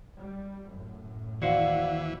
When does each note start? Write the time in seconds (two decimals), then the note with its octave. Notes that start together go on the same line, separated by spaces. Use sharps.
0.18 G3
0.69 F#2 A2
1.42 D#2 E3 F#4 C5 D5 F5 F#5